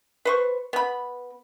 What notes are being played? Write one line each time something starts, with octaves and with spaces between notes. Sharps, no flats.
B4 C5 C#6
B3 B5